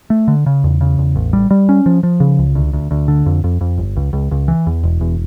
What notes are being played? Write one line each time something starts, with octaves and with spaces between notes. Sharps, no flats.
A3
D3
C#3
E2
C#3
E2
A1
G3
G3
C#4
F3
F3
C#3
C#2
D2
D2
D2
D3
F2
F2
F2
G1
C#2
C#2
C#2
E3
E2
E1
E2